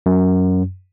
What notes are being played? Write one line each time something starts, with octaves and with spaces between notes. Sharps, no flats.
F#2